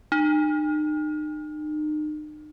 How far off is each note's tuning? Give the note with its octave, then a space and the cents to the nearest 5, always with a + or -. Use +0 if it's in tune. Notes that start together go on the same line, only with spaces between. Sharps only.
D#4 -40